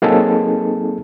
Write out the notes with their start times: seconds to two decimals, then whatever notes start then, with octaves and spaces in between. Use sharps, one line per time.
0.02 F#3 A#3 C4 D#4 G#4 A4